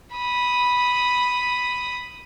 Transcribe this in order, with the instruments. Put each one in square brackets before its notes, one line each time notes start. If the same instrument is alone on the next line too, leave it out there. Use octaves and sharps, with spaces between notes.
[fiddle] B5 D#6